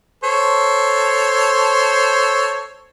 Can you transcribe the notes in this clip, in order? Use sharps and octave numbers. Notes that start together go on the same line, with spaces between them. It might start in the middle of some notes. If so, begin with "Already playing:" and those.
A4 C5 C#5